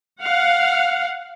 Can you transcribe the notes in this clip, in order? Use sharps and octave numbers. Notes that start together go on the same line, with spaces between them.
F5 F#5